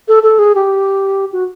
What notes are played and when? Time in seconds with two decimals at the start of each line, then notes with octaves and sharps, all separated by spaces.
0.08 A4
0.23 A4
0.39 G#4
0.55 G4
1.33 F#4